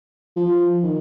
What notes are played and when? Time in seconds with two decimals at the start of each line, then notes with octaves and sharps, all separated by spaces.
0.36 F3
0.83 D#3